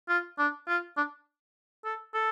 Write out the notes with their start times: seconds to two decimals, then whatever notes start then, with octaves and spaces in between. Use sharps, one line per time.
0.09 F4
0.38 D4
0.68 F4
0.97 D4
1.85 A4
2.14 A4